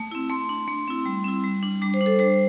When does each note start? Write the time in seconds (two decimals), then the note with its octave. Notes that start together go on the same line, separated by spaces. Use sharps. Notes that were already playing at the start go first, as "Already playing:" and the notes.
Already playing: A3 A5
0.11 C4 E4
0.30 A3 C6
0.49 D4
0.68 A3
0.88 C4 E4
1.06 G3
1.24 C4 E4
1.44 G3
1.63 D4
1.82 G3 D6
1.94 C5
2.01 D4
2.06 A4
2.19 G3 C5